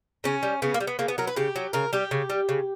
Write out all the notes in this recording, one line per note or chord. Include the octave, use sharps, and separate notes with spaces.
C#3 C#4
G3
C#3 B3
A#3
G3
B3
C#3 A#3
B3
F#3 A#4
B4
C#3 G4
F#3
C#3 A#4
G3 G4
C#3
G3
C#3